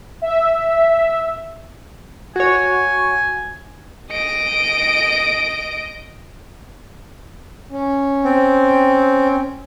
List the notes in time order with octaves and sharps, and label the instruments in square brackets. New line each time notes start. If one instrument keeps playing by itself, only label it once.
[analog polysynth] E5
[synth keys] F#4 C#5 [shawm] G#5
[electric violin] D#5 D7
[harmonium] C#4
[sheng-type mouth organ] C4